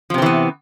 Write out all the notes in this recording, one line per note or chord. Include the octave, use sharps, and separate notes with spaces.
C3 E3 F3 B3 C4